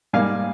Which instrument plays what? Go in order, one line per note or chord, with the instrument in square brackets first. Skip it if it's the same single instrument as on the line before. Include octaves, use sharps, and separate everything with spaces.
[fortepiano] G#2 G3 A#3 F5 G#5